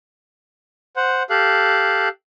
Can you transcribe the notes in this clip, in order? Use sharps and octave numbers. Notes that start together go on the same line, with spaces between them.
C5 F#5
G4 A4 F5 F#6